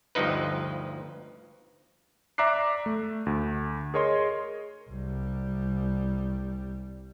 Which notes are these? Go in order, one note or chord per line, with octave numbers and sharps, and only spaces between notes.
G1 D2 G2 F3 D#4 B4
D5 E5 A#5 D6 F#6 C7
A3
D2
G#4 A#4 C#5 D#5 C6
C2 G3